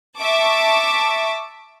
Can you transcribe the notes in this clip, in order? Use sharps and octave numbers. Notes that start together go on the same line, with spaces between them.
E5 A5 C#6 D6